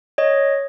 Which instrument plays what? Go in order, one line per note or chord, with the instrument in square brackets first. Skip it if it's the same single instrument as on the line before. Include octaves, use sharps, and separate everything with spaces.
[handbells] C#5 D#5